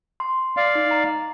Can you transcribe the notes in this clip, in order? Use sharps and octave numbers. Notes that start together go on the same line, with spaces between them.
C6
D5 F5
D#4
A#5